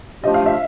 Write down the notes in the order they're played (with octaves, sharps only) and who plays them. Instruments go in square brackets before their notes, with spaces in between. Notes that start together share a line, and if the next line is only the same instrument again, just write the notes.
[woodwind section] F3 A3 D4 G4 [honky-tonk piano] D#5
[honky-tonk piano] F5
E5